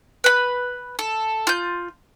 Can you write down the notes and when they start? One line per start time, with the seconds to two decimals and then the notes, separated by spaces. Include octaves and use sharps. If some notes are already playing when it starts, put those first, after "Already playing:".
0.24 B4 B5
0.99 A4
1.47 F4 G6